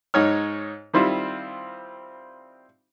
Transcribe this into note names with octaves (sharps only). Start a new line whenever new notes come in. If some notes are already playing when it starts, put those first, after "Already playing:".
G#2 D#4 C#5 F6
D#3 G3 C4 E4 F4